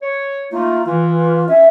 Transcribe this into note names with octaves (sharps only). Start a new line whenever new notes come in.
C#5
A3 A#3 D#4 F4
E3 F4
C#4 E5